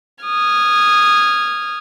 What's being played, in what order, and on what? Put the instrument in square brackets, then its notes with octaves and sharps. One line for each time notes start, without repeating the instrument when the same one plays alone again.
[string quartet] D#6 F6 G#6